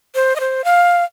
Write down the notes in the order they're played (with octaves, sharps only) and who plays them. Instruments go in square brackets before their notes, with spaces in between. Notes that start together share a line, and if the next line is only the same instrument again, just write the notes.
[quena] C5
D#5
C5
F5